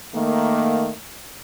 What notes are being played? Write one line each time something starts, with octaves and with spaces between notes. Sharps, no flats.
D#3 A3 A#3